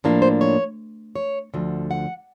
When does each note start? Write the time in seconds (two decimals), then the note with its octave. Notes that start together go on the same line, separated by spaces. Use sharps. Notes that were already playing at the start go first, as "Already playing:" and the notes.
0.04 A2 F3 A#3 D4
0.22 C5
0.41 C#5
1.16 C#5
1.54 D2 D3 F3
1.91 F#5